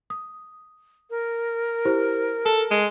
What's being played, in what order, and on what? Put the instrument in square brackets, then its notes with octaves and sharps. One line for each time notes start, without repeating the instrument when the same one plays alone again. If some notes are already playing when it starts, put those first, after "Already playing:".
[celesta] D#6
[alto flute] A#4
[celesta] E4 G4 C5
[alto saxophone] A4 [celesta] A5
[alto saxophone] G#3